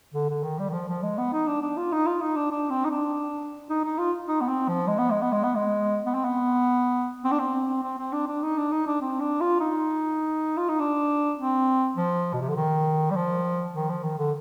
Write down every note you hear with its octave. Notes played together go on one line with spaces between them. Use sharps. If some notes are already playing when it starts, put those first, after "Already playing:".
D3
D3
D#3
G3
D#3
F3
F3
G#3
B3
D#4
D4
D4
F4
D#4
F4
D#4
D4
D4
C4
D#4
D4
D#4
D#4
F4
D#4
B3
C4
F3
G#3
B3
G#3
B3
G#3
B3
G#3
B3
C4
B3
C4
D4
C4
C4
C4
D4
D4
D#4
D4
D#4
D4
C4
D4
F4
D#4
F4
D#4
D4
C4
F3
B2
C3
D3
D#3
G3
F3
D#3
F3
D#3
D3